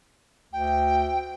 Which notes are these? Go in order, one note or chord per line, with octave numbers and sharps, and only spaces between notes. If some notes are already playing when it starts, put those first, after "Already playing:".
D2 G5